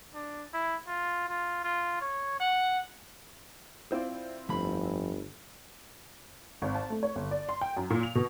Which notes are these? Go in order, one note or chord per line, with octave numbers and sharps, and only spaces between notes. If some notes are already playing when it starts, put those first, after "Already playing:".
D4
E4
F4
F4
F4
C#5
F#5
C4 E4 F4 C5 D5
G1 F2 D3 A3 B5
G#1
A5
A3
C#5
G1
D5
C6
G5
F#2
A#2
F7
B2